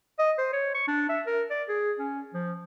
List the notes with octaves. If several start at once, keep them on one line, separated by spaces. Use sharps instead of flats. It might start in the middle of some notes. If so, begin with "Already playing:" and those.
D#5
C5
C#5
C#6
D4
E5
A#4
D5
G#4
C#4
F3